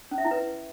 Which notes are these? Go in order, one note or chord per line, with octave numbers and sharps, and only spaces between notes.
C#4
E5
E4
B4